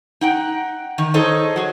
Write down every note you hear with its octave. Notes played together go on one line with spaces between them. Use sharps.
D#4 F#5 G5
D#3
D#4 G#4 A4 C5 C#5 D#5
F#3 G#4